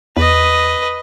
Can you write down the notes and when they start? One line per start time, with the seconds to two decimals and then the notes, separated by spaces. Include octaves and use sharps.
0.17 E2 B4 D#5